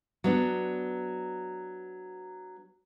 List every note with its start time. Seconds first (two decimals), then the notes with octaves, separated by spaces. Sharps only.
0.24 F#3 B3 D4